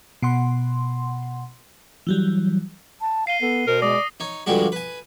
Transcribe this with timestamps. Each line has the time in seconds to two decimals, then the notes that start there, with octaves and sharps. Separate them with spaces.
0.23 B2 F#5 C6
2.07 E3 F#3 G3
3.01 A5
3.27 F5 C7 D#7 G7
3.41 B3 A4
3.67 B2 A#4 C5
3.82 G#3 D5 D#6 A#6
4.20 D#4 C#5
4.46 G2 D3 F3 G3 G#3 F#4
4.72 B4 G#5